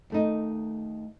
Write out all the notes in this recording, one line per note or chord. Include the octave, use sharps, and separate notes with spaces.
D#2 A3 D#4